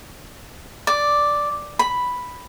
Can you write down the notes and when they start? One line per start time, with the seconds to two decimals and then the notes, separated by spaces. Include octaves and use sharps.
0.87 D5
1.79 B5